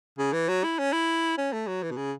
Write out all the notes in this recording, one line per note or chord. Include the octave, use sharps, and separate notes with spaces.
C#3
E3
F#3
E4
C#4
E4
C#4
A3
F#3
E3
B2
C#3